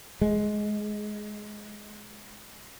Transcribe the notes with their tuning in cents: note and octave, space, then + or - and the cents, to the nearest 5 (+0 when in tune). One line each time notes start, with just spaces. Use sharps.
G#3 +15